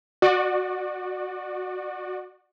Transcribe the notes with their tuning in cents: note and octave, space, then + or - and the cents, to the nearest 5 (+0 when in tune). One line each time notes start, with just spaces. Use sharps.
F#4 -10 D5 +30